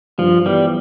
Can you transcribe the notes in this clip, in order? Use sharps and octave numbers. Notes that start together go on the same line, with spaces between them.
G2 F3
E3 G3 B3